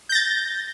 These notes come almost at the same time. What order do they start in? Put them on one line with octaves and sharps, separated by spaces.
G6 A#6 A6